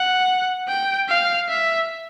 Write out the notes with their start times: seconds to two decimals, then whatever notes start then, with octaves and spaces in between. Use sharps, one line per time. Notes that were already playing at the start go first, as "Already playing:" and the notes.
Already playing: F#5
0.68 G5
1.09 F5
1.49 E5